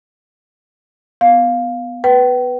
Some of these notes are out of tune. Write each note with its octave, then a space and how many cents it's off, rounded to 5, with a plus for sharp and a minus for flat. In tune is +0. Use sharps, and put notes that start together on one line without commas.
B3 +10 F5 +5
B4 +0 G5 -40